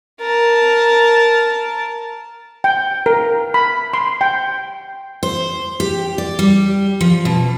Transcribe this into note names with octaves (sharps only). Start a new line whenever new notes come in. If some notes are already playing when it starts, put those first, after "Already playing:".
A#4 A5
G5
A#4
B5
C6
G5
C5
G4
D5
G3
F3
B2